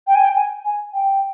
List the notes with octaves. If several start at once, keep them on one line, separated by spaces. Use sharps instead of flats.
G5
G#5
G5
G#5
G#5
G5